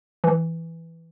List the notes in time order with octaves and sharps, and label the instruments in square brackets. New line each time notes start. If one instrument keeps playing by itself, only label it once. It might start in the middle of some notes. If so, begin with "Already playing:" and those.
[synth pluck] E3